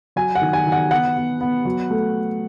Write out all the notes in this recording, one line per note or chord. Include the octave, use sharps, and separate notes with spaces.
F#3 G#5
F#5
D#3
G#5
D#3
F#5
B3 F#5
B3
B3
F#3
A3